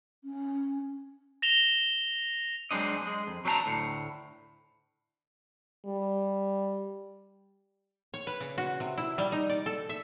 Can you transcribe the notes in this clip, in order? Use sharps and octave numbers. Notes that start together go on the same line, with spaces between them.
C#4
A#6 E7 F7 G7
F#3 G#3 C4 D4 D#5
G#3
F2
F#3 C4 D4 B4 A5 A#5
D2 A2
G3
C#5
B4
C#3
F#4
C3
E4
G3
D#4
D5
A4
E5